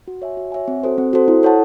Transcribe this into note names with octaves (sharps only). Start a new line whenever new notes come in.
F#4
C#5 E5 G#5
F#4
C#5 E5 G#5
C4
F#4 A4 C5
C4
F#4 A4 C5
E4
A4 C#5 F#5 A5